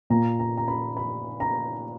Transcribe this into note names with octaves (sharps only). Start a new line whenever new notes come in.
A#2 A#3 A#5
A#5
A#5
B5
B5
A#5